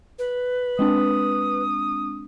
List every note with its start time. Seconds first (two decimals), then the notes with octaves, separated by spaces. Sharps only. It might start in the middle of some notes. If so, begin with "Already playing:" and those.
0.18 B4
0.79 G#3 C4 D4 D#6